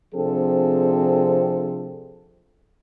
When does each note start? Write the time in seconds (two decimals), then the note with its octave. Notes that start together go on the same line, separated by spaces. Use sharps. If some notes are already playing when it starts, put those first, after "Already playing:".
0.14 C3 F3 C4 D4 G#4 A4